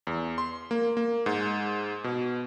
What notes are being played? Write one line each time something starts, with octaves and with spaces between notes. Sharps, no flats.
E2
C6
A#3
A#3
G#2
B2